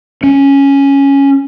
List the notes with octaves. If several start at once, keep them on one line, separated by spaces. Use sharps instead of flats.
C#4